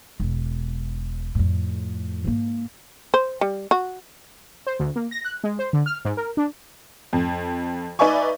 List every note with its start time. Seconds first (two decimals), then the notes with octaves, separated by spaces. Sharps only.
0.20 E1
1.35 F2 A2
2.24 G#2 A#3
3.14 C5
3.41 G3
3.71 F#4
4.67 C5
4.79 D2
4.96 A#3
5.11 A#6
5.25 F#6
5.44 G#3
5.59 C5
5.73 D3
5.86 F6
6.05 G#2
6.17 A#4
6.37 D4
7.13 F2
7.99 D#4 B4 D5 E5 G#5 C#6